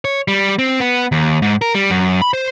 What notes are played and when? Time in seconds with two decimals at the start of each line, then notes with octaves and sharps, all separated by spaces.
0.05 C#5
0.28 G3
0.59 C4
0.80 B3
1.12 D#2
1.42 G#2
1.62 A#4
1.75 G3
1.90 F#2
2.22 B5
2.33 C5